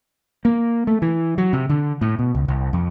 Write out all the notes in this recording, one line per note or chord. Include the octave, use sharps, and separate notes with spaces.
A#3
A3
E3
F#3
C3
D3
A2
B2
C#2
C2
F2